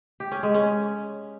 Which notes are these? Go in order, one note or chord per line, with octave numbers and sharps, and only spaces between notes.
G4
C#4
G#3
C#4